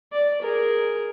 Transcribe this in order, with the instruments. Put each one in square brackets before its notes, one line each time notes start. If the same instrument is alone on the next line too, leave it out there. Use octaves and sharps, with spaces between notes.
[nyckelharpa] D5
G#4 A#4